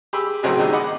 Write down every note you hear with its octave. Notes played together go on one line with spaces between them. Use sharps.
G4 G#4 B5 D6 E6
A#1 A2 C#3 F#3 C4 G#4
D#3 E3 G3 A#3 D#4
D#5 F#5 B5 D6 D#6